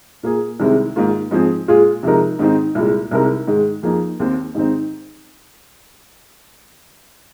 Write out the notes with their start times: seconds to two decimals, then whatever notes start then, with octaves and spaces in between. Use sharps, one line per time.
0.23 A#2 A#3 G#4
0.60 C2 C3 D#3 G#3 C4
0.96 G#2 D#3 A#3 F4
1.31 G#2 F3 C4 G#4
1.68 A#2 G#3 F4 G#4
2.03 C3 F3 G#3 D#4 A#4
2.39 G#2 D#3 C4 D#4
2.75 C2 A#2 G#3
3.11 C2 C3 G#3 D#4 A#4
3.47 G#2 D#3 G#3
3.83 F2 F3 A#3 D#4 G#4
4.20 D#2 D#3 C4
4.55 G#2 D#3 C4 D#4